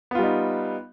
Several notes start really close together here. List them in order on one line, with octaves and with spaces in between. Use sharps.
B3 F4 G3 D#4